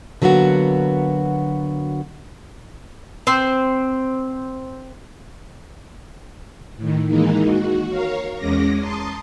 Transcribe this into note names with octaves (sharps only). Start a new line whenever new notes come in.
D3 F#3 A#3 B3 F#4
C4 C5
A2 D#3
D#3 E3 G#3 A#3 D#4
F#4
A#4 C#5 F5
E2 G#3 C#4 D6 A#6
A5 A#5 C6 D#6